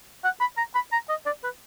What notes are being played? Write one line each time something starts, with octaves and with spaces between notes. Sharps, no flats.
F#5
B5
A#5
B5
A#5
D#5
D5
B4